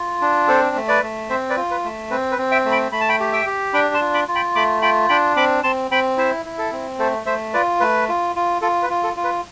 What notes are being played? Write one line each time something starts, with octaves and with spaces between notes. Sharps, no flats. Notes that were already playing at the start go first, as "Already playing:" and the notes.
Already playing: F4
D4
C4 A4 C5
A3
B4 D5
A3
C4 C5 E5
B4 D5
F4
B4
A3
C4 B4
B4
C4
E5 G5
A3
G5 B5
A3 B5
A5
G5 B5
G4
E5 G5
G4
D4 G5 B5
A5 C6
F4
B5 D6
F4
G5 B5
A3 B5 D6
F4 G5 B5
D4 G5 B5
C4 B5 D6
C4 A5 C6
C4 G5 B5
E4 C5 E5
E4
A4
C4
A3 A4 C5
A3 C5 E5
F4 B4 D5
A3 B4
F4
F4
F4 A4
B4
F4
A4
F4
B4